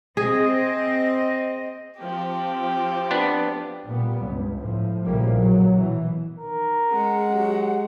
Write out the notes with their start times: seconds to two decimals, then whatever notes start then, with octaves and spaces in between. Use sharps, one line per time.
0.17 C4 G#4 D#5
2.00 F3 C4 G4
3.11 B3 D4
3.88 A#2 G3 B3
4.23 C#2 G2
4.58 A2 F3
5.04 A#1 A2 C#3 F3 G3 A#3
5.37 F#3
5.70 B2 E3
6.38 D#3 A#4
6.90 G#3 C#4 F#5
7.32 F#3 G4